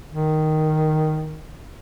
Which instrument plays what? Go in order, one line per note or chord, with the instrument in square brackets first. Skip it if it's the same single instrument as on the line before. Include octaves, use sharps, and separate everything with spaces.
[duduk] D#3